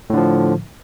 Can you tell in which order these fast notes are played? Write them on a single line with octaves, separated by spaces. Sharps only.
A2 D3 F3